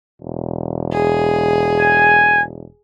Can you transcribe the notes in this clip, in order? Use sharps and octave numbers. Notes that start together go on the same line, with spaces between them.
E1
G#4
G#5